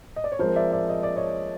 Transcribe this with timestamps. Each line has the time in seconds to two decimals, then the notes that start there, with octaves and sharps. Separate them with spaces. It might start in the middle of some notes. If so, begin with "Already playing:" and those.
0.16 D#5
0.24 D5
0.32 C#5
0.39 F3 G#3 C4 A#4 C5
0.56 D5 E5
0.72 D5 E5
0.89 D#5
1.03 D5
1.16 C#5 D#5